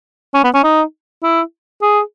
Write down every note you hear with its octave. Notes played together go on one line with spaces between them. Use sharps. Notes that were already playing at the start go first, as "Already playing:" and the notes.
C#4
B3
C#4
D#4
E4
G#4